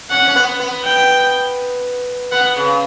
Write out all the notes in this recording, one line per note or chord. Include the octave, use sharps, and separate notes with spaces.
C#4 F#5
C#4
B3
B3
G5
B3 F#5
C#3